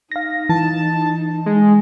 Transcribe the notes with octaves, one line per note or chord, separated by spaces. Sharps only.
D#4 F5 A#6
E3 A5
G#3